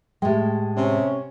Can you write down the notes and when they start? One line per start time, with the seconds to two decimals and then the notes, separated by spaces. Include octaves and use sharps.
0.22 A2 G#3 G4 G5
0.77 C3 C#4